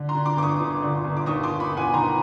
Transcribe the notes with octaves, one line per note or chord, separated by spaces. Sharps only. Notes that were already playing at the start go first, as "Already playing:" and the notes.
Already playing: D3
A#5 C6
D3
C6 D6
G1 D6
C#6 D#6
G1
D3
G1
D6
D#2 C#6 D#6
C6 D6
D#2
B5 C#6
E1
F#5 G#5
D#3 A#5 C6